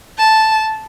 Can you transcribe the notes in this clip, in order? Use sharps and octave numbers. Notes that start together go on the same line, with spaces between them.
A5